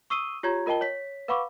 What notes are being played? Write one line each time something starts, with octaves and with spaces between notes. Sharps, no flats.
C#6 D#6 E6 C7 D#7 G7
F4 G4 C#5 A#5 G#6
F4 A#4 D#5 G5 A5 G7
C#5 B6
B4 F5 F#5 B5 C#6 D6